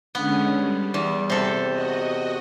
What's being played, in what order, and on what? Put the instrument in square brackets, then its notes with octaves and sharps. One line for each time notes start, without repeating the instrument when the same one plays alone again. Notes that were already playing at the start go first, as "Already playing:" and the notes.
[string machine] D3 G#3 C#4 [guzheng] B3
[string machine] G3
[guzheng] E2
C3 A4
[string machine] F#4 D#5